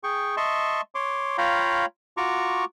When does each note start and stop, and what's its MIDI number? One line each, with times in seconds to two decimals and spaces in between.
0.04 0.36 68
0.04 0.36 79
0.04 0.36 85
0.37 0.81 75
0.37 0.81 76
0.37 0.81 81
0.37 0.81 84
0.37 0.81 85
0.95 1.37 73
0.95 1.37 84
0.95 1.37 86
1.38 1.86 65
1.38 1.86 73
1.38 1.86 77
1.38 1.86 79
1.38 1.86 82
1.38 1.86 83
2.17 2.65 65
2.17 2.65 66
2.17 2.65 82
2.17 2.65 85
2.17 2.65 86